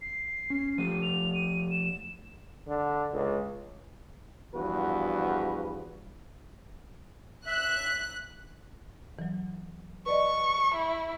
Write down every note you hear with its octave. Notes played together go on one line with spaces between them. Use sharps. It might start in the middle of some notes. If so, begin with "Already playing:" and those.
C7
C#4
F3 A3 G4 D#7
F7
D#7
E7
D3
C#2
E2 G2 F3 F#4 B4
E5 F#6
E3 F#3
B4 D5 D#5 C#6
E4